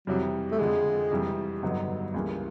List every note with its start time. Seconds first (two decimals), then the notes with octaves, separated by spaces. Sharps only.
0.07 F2 C3 E3 F#3 G3
0.51 A3
0.58 F2 D3 F3 G#3
1.11 F2 C3 E3 G3
1.63 G2 D3 F#3 B3 D#4
2.14 C#2 C#3 E3 G3 A#3